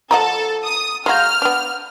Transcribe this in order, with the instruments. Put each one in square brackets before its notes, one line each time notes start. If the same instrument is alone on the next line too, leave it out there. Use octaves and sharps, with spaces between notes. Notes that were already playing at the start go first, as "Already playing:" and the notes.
[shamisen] F3 D#5 F#5 [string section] A4 [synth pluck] A#5
[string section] D#6
[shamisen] G#3 F#4 [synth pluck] F5 A#5 G6 [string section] F6
[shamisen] B3 D4